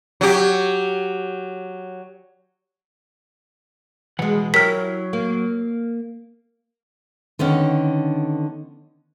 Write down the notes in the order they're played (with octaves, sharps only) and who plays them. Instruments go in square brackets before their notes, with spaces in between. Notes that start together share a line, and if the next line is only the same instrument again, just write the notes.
[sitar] F#3 G4
[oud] B2 G#3 [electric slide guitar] E3 F#5
[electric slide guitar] F#3 C#5 [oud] E4 G4 A#4 [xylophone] F6 B6
[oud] A#3
[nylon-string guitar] D3 D#3 B3 C#4